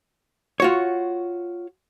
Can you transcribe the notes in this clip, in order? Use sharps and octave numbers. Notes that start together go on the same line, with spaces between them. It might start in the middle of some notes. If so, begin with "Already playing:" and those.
F4 F#4 C#5